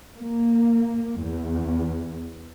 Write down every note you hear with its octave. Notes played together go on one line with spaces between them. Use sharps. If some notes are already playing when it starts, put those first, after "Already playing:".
A#3
E2